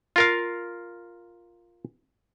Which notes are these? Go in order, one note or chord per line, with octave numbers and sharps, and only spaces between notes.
F4 A#4 F5